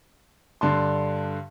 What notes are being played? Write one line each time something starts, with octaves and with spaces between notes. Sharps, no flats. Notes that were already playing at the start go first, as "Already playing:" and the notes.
G2 D3 A5 C6